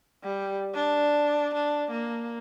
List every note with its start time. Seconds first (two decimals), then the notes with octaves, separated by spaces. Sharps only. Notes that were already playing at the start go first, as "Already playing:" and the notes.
0.23 G3
0.74 D4
1.54 D4
1.91 A#3